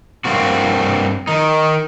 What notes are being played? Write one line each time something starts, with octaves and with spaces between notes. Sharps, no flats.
G2 A#3 C4 F#4
D#3 D#4